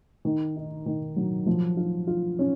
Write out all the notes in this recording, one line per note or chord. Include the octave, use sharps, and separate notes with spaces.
D#3
D#4
D#3
F#3
F3
F4
F4
C#4